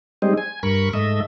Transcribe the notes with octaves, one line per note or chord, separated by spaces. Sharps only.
G3 G#3 C4 D#4
G#5
G2 A#4 B5 C#6
G#2 A3 D#5 E5